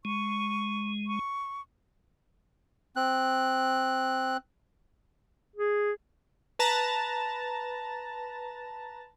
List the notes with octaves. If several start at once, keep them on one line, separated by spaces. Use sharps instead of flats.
G#3 C#6
C#6
C4 F#6
G#4
B4 A5 A#5